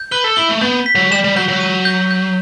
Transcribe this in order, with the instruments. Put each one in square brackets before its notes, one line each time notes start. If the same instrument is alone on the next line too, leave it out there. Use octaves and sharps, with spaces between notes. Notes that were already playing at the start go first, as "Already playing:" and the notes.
Already playing: [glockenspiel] G6
[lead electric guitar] B4 [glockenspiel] G7
[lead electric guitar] A4
[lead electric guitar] E4 [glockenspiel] G7
[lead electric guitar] A3
[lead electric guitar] B3 [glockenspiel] G6
[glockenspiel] B6
[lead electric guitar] F#3
[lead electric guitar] G3 [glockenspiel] E7
[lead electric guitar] G3
[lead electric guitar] F#3 [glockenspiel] G6
[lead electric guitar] F#3
[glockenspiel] D#7
G6
G6